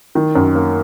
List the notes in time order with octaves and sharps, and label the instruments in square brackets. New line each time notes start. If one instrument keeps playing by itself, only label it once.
[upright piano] D#3
F#2
A#3